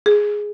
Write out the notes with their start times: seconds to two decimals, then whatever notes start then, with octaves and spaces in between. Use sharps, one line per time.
0.06 G#4